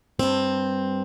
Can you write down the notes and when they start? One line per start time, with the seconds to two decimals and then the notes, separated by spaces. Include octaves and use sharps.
0.19 G2 C4